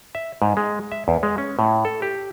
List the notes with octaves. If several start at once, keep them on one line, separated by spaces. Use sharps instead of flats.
E5
G#2
G#3
E5
E2
G#3
C#4
A2
A4
G4